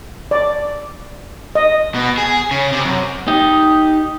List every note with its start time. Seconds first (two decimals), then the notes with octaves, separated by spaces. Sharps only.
0.31 D5
1.55 D#5
1.95 B2
2.18 G#4
2.51 C#3
2.73 C3
2.85 F#2
3.28 D#4 G4